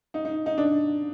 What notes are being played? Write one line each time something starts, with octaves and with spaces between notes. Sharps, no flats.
D#4
D#4
D#4
D4